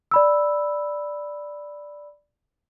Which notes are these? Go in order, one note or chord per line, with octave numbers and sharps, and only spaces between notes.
D5 B5 E6